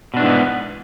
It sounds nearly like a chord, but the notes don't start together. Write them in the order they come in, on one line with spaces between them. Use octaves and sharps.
B2 D4 E3 G#2 B3